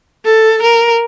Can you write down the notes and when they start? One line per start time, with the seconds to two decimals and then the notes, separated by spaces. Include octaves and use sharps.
0.25 A4
0.62 A#4